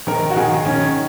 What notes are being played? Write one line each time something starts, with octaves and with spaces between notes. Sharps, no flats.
D#3 A#4
F#4
D#3 G#4
D#3 C#4